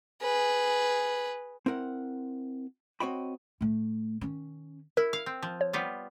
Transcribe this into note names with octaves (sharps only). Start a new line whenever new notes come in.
G#4 B4
C4 E4 A#4 F#5
C4 F#4 C#5 D#5 G5 B5
A2 A3
D#3 C#4
E4 A#4
F5
C4
F3
C#5
G3 B3 F4